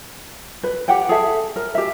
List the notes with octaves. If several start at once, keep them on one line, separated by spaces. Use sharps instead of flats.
B4
G4 F#5 G5
G#4 A4 E5
A#4
G4 E5